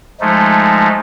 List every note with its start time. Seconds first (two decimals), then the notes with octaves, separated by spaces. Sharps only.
0.21 F3 G#3 A3 D#4